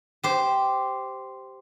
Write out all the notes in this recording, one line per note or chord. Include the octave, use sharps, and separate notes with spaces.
G4 C5